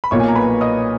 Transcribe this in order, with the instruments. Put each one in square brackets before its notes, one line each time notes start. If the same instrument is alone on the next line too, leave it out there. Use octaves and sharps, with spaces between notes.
[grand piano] B5
[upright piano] B1 A#2 A#3 [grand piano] C#5 C#6
[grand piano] G#5
A#5
B4 B5
D#5 D#6